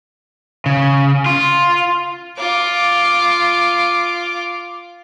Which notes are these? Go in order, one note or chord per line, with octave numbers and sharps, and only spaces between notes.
C#3
F4
F4 D6